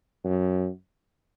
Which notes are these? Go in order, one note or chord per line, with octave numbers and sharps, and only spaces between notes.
F#2